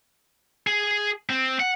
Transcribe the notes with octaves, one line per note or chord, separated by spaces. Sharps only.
G#4
C4
F#5